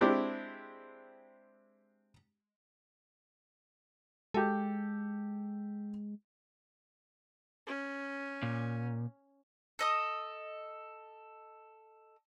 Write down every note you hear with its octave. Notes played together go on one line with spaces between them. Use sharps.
G#3 C4 D4 E4 G4
G#3 G4 A4
C#4
A#2
A4 D#5 D#6